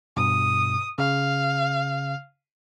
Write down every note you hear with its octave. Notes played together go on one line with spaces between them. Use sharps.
G2 B2 D#6
C#3 F5